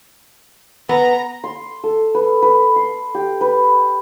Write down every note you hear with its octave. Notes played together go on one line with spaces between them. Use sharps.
B3 A#5
C6
A4
B4
B4
C6
G4
B4